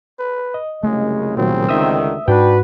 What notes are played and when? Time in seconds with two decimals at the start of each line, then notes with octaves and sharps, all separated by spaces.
0.19 B4
0.54 D#5
0.83 C2 F#2 C#3 G#3 A3
1.37 A#2 D#3 F#3 C4
1.69 C#2 D3 D#3 E5 D#6 E6
2.28 G#2 D4 F#4 B4 G5